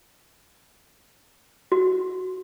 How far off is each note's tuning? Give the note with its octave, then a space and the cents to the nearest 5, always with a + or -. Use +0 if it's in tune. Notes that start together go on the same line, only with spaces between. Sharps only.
F#4 +0